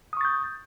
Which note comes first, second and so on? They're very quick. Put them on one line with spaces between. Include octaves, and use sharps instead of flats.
D#6 C#6 A6 G6